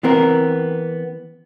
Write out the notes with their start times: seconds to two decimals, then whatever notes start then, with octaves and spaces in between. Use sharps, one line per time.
0.03 E3 B3 C4 A#4